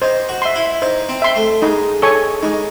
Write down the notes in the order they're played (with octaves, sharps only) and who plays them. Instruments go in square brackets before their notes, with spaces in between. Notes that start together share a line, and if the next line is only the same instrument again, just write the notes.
[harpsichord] D#4 [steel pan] C5
[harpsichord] F#4
[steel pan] E5 C6
[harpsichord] E4
[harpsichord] D#4 [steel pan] C5
[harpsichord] C4
[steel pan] E5 C6
[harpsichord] A3
[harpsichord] G#3 [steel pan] D#4
[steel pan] A4 C#5 G#5 C#6
[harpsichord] G#3 [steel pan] D#4